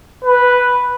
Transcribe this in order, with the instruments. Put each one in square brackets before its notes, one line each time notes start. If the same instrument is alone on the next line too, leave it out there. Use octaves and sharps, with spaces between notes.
[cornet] B4